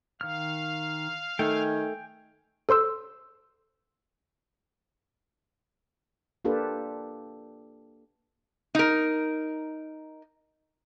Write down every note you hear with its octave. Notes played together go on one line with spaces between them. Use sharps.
D#3 F5 F6
D#3 A3 G5 G#5
A4 C5 C6 E6
A#3 D4 F4 G4 A4 B4
D#4 A#4